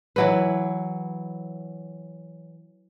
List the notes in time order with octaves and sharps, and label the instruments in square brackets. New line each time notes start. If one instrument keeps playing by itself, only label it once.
[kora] E3 F#3 B4